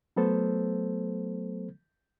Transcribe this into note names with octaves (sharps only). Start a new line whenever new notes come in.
F#3 A3 B3 A4 C5